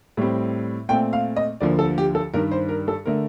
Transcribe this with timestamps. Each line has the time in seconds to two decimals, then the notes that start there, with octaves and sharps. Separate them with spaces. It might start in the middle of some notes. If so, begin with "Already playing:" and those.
0.17 A2 G3 C4
0.89 A#2 A3 C4 G5
1.13 F5
1.36 D#5
1.61 D2 D3 F3 A#3 D5
1.79 A4
1.98 G4
2.15 A4
2.34 G2 D#3 G3 A#4
2.51 C5
2.69 A#4
2.88 A4
3.06 D3 A3 A#4